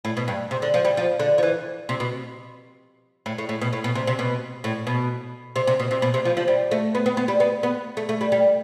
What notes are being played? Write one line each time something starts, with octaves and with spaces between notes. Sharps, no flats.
A2
B2
G2
C3
D3
F3
G3
F3
D3
F3
E3
C3
B2
A2
A2
A2
B2
A2
B2
C3
C3
B2
A2
B2
C3
C3
B2
C3
B2
C3
F3
F3
G3
A3
B3
B3
B3
G3
B3
B3
A3
A3
G3
G3